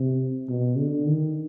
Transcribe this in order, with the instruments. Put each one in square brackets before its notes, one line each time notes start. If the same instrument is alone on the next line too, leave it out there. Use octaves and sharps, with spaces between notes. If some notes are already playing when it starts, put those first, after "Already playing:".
Already playing: [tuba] C3
B2
D3
D#3